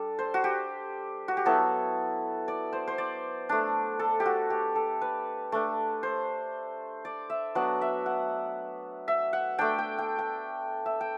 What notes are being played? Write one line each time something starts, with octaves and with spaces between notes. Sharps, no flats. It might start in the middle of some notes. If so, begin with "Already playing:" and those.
Already playing: G3 D4 A4
C5
F#4
G4
F#4
G4
F#3 B3 E4 A4
D5
C5
C5
D5
A3 D4
A4
G4
F#4
G4
A4
B4
A3 D4
C5
D5
E5
F#3 B3 D4 F#5
E5
F#5
E5
F#5
A3 D4 G5
G5
G5
G5
E5
G5